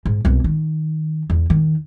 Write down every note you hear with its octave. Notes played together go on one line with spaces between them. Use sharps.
G#2
C2 B2
D#3
E2
D#3